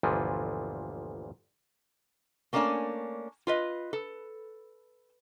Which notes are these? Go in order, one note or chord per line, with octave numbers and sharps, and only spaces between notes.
G1 D2 A#2 E3 F3
A3 A#3 C#4 D4 D5 G#5
F4 B4 D#5
A4